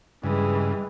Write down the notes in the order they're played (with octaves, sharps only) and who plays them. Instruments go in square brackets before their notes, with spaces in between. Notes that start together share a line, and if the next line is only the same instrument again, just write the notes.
[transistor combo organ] G2 C#3 [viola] E3 G#3 [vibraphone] G3